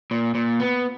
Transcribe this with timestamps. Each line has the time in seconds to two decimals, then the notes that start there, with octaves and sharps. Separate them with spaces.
0.11 A#2
0.35 A#2
0.60 B3